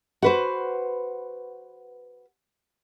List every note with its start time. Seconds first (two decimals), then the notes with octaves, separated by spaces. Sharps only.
0.22 F#4 B4 C5